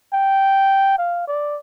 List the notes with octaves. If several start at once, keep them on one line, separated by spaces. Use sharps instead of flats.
G5
F5
D5